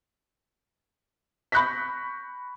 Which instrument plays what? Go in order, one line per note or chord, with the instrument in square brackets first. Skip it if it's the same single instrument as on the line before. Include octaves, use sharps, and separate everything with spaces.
[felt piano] B5 C#6 F#6 G6 A#6 B6